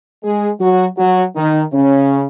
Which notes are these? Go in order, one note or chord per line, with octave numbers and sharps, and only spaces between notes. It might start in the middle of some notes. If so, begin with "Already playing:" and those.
G#3 G#4
F#3 F#4
F#3 F#4
D#3 D#4
C#3 C#4